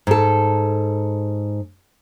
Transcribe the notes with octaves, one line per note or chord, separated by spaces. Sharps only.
G#2 A4